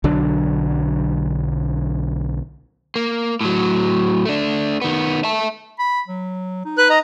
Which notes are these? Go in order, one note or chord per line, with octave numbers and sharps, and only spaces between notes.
B1 D3 F#3 D4
A#3
A2 F#3
A3 D4
D#3 B3
E5 A5
B5
F#3
D#4
B4 F#6
D#5 A#5